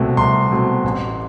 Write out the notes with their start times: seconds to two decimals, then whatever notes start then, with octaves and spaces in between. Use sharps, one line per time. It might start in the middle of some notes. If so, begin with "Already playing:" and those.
Already playing: C2 B2 A3 C4
0.17 C2 C6
0.51 B2 A3 C4
0.84 A1